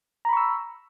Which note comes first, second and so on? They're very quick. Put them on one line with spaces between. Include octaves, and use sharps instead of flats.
A#5 B5 C#6 E6